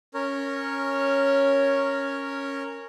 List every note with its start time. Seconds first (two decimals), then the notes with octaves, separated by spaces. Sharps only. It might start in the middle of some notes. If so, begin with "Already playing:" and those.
0.14 C#4 A#4 C#5